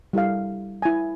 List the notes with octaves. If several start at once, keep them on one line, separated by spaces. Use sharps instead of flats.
G3 E4 A4 F5
E4 G#5